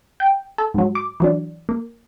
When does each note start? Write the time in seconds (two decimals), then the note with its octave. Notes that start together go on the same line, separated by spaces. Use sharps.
0.20 G5
0.58 A4
0.74 G#2 F#3
0.95 D6
1.20 E3 F#3 D4
1.69 A#3